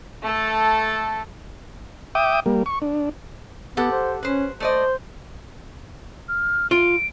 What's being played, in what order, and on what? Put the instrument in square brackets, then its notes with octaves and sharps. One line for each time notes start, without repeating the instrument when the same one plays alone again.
[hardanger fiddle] A3 A4
[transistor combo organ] E5 G5 D6 D#6
G3 A#3
C#6
D4
[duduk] B3 [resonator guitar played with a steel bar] G4 A4 F#5
[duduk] C5
[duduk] C#4 [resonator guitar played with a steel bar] B4 C5
[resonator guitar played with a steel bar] A3 D5 D#5 [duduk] C5
[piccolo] F6
[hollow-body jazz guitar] F4 [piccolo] D7